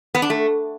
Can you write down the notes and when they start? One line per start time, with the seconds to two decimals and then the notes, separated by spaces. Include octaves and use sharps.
0.15 B3
0.22 D4
0.30 A3